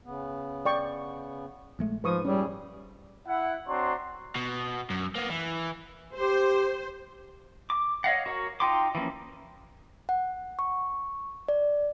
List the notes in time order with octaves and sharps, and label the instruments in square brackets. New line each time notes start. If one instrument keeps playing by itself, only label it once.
[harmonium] C#3 B3
[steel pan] D5 G5 C#6
[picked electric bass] A#1 G#3 A3
[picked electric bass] G#2 [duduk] F3 [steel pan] B4 C#6 D#6
[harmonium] A#2 E4 G#4 [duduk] G3 [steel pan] C#4
[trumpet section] E4 F#5
C4 D4 F#4 C#5 A#5 C6
[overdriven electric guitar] B2
F#2
A#3 B3
E3
[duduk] G4 [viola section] C5
[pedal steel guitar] D6
C#5 D#5 F5 F#5
F#4 A#4 C#5
D#4 F4 G5 C6 D6
E3 F3 A#3 C#4
[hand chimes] F#5
C#6
D5